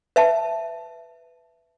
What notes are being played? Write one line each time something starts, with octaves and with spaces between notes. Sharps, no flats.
B4 E5 A5